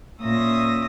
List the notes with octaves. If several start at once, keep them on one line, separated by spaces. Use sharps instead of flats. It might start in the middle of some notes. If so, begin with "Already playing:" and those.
A#2 C#4 E5 D#6 A#6